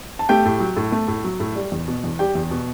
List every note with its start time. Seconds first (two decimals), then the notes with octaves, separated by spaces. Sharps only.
0.19 A5
0.29 A3 G4 G5
0.46 A2
0.60 F#3
0.77 A2
0.92 A3
1.08 A2
1.24 F#3
1.40 A2
1.56 G3
1.72 E2
1.88 B2
2.04 E2
2.19 G3 G4 G5
2.35 E2
2.51 B2